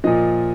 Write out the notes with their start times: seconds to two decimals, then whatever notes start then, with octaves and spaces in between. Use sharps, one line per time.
0.04 A#2 F3 D#5